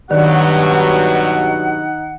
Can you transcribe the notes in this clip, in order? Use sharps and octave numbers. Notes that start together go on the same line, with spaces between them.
G2 B2 D#3 F#3 D#4 D5 F#5